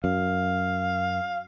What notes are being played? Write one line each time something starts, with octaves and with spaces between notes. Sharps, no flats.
F#2 F5